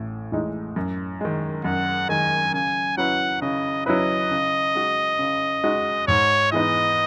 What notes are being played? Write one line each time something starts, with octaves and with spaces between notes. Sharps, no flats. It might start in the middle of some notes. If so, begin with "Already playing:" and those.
Already playing: A1 A2
A2 E3 G#3 D#4
F#2
D#3 G#3
F#2 F#5
D#3 G#3 G#5
C#3 G#5
F#3 C#4 E4 B4 F#5
C#3 D#5
F#3 C#4 E4 B4 D#5
C#3
G#3 D#4 F#4
C#3
G#3 D#4 F#4
G#2 C#5
E3 G#3 B3 D#4 D#5